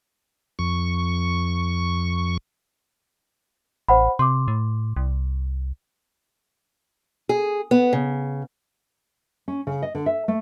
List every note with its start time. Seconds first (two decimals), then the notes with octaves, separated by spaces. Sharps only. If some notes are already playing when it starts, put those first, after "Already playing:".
0.59 F2 C#6
3.88 A1 C5 F#5 B5
4.19 C3 C6 D6
4.48 A2
4.97 C2
7.29 G#4
7.71 B3
7.93 C#3
9.48 C#4
9.67 C#3
9.82 D#5
9.95 D3
10.06 E5
10.28 A3